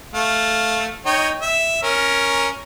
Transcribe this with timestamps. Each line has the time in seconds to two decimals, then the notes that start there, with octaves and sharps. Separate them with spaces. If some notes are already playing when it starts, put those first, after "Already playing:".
0.14 A3 F5
1.06 D#4 C#5 G5
1.42 E5
1.83 C#4 A#4